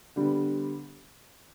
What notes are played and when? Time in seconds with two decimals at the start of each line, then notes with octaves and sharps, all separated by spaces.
0.16 D3 G3 B3